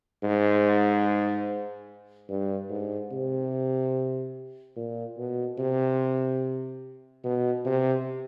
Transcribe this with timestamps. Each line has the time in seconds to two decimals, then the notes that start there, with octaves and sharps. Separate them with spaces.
0.23 G#2
2.29 G2
2.70 G#2
3.11 C3
4.76 A#2
5.17 B2
5.58 C3
7.24 B2
7.65 C3